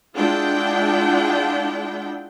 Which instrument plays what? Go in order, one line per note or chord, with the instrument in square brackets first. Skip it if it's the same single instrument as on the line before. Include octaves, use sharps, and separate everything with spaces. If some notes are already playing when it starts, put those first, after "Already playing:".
[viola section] G#3 D4 E4 F4 F#5 G5